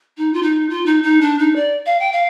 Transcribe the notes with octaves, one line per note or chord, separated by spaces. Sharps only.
D#4
F4
D#4
F4
D#4
D#4
D4
D#4
D5
F5
G5
F5